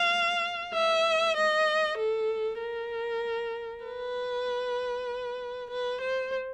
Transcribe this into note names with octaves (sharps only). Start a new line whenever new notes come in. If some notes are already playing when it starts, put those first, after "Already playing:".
Already playing: F5
E5
D#5
A4
A#4
B4
B4
C5